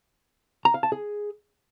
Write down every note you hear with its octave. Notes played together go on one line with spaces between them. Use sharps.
A#5
F5
A5
G#4